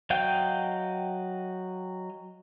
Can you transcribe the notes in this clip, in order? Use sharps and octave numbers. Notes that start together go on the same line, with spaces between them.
F#3 D#5 F5 G5 G6